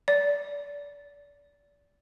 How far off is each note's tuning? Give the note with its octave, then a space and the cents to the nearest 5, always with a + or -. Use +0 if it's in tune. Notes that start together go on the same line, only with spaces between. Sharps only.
D5 -30